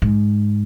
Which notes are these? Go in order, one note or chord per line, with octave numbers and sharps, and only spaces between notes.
G#2